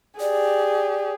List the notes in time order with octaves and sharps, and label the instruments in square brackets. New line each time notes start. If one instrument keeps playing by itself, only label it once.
[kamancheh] G4 G#4 [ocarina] D5